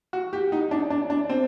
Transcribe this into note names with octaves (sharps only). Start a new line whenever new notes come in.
F#4
G4
D#4
D4
D4
D4
C4